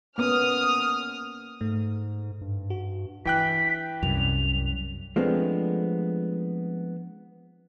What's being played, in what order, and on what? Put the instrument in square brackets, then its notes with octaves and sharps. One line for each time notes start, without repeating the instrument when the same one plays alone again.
[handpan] A#3 B3 C#4 [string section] D#6 F6
[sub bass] G#2 [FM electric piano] A3
[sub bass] G2
[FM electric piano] F#4
[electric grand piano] E3 G5 F#6 [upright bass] D4 [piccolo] B6
[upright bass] C2 C3 [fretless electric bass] F#2 [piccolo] F7
[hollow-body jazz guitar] F3 G#3 A3 B3 C4 D4